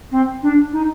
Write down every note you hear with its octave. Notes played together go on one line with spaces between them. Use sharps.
C4
D4
D#4